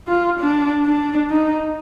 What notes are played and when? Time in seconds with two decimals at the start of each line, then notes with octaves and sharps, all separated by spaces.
0.08 F4
0.39 D4
0.85 D4
1.30 D#4